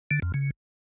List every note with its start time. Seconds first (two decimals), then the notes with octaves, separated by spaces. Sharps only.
0.11 D3
0.22 F2
0.34 C#3